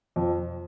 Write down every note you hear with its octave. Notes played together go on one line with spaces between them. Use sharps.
F2